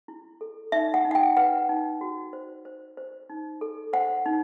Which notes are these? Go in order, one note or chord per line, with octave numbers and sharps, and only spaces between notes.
E4
A4
D#4 E5
F#5
D#4
F#5
G5
B4 F#5
D#4
F#4
C5
C5
C5
D#4
A4
C5 F#5
D#4